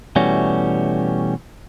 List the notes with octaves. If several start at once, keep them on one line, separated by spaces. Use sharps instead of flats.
B2 E3 G3 A3 C#4 F#4